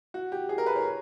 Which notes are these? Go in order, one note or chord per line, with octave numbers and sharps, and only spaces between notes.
F#4
G4
G#4
A#4
B4
C#5